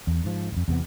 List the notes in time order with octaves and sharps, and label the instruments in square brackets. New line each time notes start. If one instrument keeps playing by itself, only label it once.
[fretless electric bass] E2
G#2 F3
D#1 F2
E2 C3 B3